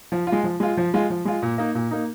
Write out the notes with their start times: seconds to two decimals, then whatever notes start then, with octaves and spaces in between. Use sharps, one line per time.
0.12 F3
0.27 F4
0.32 G#3
0.44 F3
0.60 G#3 F4
0.77 F3
0.94 G#3 F4
1.10 F3
1.25 G#3 F4
1.42 A#2
1.58 A#3 D#4
1.75 A#2
1.91 A#3 D#4